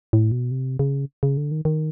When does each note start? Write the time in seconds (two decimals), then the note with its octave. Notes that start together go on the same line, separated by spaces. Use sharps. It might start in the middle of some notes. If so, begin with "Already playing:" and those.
0.13 A2
0.32 B2
0.51 C3
0.79 C#3
1.23 C#3
1.37 D3
1.51 D#3
1.65 D#3